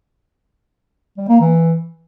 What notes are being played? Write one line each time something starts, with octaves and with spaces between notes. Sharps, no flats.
G3
A#3
E3